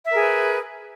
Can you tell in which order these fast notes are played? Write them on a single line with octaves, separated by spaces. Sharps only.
E5 A#4 G#4 B4